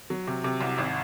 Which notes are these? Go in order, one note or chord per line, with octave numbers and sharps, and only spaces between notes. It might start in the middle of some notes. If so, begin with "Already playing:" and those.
F#3
C3
C3
C2
G#1